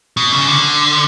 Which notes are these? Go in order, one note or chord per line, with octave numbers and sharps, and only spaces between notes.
B2
C#3
D3